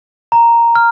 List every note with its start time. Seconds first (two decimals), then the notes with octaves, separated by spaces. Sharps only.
0.32 A#5
0.75 F6